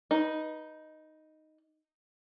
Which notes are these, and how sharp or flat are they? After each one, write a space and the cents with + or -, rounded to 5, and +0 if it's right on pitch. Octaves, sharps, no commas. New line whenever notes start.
D#4 +0 B4 -25